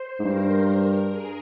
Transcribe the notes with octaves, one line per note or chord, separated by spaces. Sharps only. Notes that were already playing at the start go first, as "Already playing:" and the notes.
Already playing: C5
G#2
G2 A#4
G#4